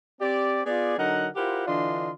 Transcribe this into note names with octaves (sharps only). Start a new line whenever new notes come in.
C4 G4 D5
B3 F4 G#4 D5
D3 F#3 D#4 A#4 F#5
E4 F4 G4 A#4 C5 F#5
D3 E3 D4 F4 D#5 C6